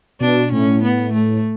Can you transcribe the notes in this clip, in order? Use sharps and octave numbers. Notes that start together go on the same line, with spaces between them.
B2 D4
A2 C#4
B3
A3